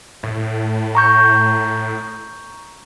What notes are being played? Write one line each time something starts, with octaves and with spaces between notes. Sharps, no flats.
A2
A#5 C#6 G6